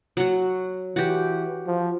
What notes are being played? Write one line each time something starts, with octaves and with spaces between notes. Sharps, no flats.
F#3 F#4
E3 F#4 G4
F3